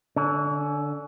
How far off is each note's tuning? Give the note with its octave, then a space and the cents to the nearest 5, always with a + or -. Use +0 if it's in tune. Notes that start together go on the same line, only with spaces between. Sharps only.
D3 +0 C#4 +35